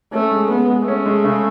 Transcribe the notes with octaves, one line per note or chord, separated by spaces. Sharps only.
A3 C#4
G#3
G#3 B3
G#3
A3 C#4
G#3
C#3